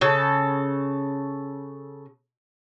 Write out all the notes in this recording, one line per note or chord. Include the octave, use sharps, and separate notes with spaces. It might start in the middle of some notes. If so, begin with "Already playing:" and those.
C#3 A4